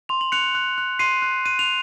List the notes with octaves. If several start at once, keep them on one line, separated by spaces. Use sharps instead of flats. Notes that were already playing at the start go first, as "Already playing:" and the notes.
C6 F7
F#7
F#6 C#7 F7
F#6
F#6
C6 C7 D#7
F#6
F#6 D#7
F7